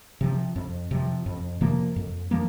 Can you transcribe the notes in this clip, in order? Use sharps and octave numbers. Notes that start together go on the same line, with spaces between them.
C3 F3
F2
C3 F3
F2
C3 F3 A#3
F2
F3 A#3